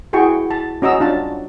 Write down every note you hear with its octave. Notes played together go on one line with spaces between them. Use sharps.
E4 F#4 G#4 G5 C#6
A5
C#4 F#4 D#5 A#5 E6
D4 F4 A5